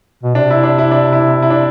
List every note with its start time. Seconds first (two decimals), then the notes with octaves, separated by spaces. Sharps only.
0.23 B2
0.35 C3 D4
0.50 E4
0.63 D4
0.78 E4
0.91 D4
1.13 E4
1.42 E4
1.50 D4